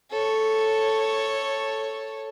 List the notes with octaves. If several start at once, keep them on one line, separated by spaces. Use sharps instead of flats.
A4 C#5